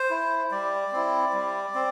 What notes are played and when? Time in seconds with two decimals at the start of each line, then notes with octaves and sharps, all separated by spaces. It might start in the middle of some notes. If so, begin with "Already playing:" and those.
Already playing: C5
0.10 E4
0.51 G3 D5
0.92 C4 E4
1.33 G3
1.75 C4